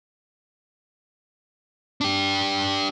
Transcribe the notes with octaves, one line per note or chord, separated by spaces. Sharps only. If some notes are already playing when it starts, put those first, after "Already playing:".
D4 G4